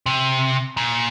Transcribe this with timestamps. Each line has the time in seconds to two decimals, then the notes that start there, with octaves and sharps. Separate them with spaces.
0.06 C3
0.77 A#2